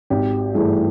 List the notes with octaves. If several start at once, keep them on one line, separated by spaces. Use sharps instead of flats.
G#1 G4
G2 E3 A3 G#4